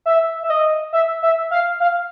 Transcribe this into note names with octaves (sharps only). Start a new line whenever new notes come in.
E5
E5
D#5
E5
E5
F5
F5